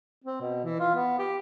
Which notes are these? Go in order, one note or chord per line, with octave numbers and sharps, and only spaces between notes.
C4
B2
E3
F4
B3
G4